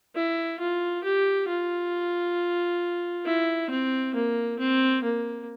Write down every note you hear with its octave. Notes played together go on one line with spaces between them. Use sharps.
E4
F4
G4
F4
E4
C4
A#3
C4
A#3